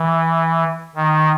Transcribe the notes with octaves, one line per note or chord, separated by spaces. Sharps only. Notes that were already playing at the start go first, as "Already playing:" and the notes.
Already playing: E3
D#3